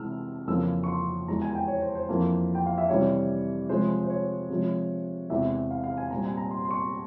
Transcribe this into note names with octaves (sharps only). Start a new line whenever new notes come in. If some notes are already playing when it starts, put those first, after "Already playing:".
Already playing: C3 E3 G#3 E6 F6
F2 C#3 E3 A#3 E6
C#6
C6
E2 E3 G#3 A#5
G#5
G5
C#5
C5
C5
F2 E3 A#3
G5
F5
E5
C3 E3 G3 C#4 C#5
C3 F3 G#3 C#4 C5
C5
C#5
C3 F3 G#3 C#4
E2 C3 E3 G#3 E5
F5
F5
G#5
A#2 G3 C4 A#5
G#5
A#5
C6
C6
C#6